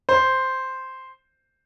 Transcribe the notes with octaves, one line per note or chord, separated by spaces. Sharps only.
C5